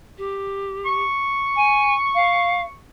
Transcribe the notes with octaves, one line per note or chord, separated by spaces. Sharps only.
G4
C#6
G#5
F5